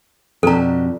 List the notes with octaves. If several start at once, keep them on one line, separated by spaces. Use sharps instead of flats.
F2 B2 D4 G4 A4 A#5